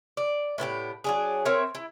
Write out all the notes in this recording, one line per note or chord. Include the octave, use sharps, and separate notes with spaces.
D5
A2 B3 E4 G4
F#3 D4 G#4
C4 A#4 C#5 E5
E4